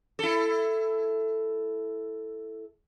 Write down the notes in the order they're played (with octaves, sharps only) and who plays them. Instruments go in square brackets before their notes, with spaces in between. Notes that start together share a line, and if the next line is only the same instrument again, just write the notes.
[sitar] E4 A4